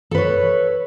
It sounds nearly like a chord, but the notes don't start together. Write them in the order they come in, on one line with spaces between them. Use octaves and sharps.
A4 B4 C#5